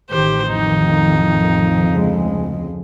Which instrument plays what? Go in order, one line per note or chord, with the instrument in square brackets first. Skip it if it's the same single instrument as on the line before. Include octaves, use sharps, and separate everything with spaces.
[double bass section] A1 D#3 [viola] G4 C5
[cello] F2 [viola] D#4
[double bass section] D2 C#3 G#3